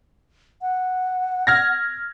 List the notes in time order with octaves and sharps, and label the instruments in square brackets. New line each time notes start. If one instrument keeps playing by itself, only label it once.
[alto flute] F#5
[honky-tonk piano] F6 G#6 A#6